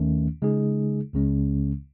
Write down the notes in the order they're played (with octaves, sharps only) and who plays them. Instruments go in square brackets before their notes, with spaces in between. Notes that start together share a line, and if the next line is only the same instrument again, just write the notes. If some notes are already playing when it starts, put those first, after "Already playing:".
Already playing: [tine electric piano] D#2 D#3 A3 C#4
C#3 G#3 D#4 G#4
C#2 C#3 G#3 C#4